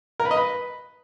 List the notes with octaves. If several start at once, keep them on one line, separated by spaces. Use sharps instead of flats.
A#4
B4
D#5
B4